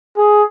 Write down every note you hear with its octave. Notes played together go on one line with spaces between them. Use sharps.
G#4